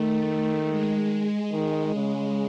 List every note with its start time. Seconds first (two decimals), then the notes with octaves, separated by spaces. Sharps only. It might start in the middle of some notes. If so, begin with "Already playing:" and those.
Already playing: D#3 A3
0.67 G#3
1.51 D#3 G#3
1.95 C#3